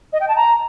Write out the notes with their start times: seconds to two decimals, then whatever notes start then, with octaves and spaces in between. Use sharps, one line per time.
0.13 D#5
0.21 G5
0.28 A5
0.36 A#5